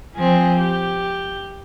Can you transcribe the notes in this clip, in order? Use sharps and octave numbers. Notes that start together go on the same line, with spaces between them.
F3 C4 G#4
G4